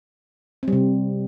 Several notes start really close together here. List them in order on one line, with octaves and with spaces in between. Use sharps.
C4 G3 C3